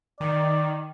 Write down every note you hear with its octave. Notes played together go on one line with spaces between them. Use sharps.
D#3 D5